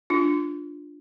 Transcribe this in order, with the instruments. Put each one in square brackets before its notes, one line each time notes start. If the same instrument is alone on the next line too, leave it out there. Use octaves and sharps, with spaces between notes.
[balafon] D4 F4